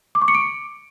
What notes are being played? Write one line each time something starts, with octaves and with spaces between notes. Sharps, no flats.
D6
C#6
C#7
D7